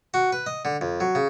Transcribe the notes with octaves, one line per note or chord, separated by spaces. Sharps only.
F#4
B4
D#5
D3
F2
F#3
C#3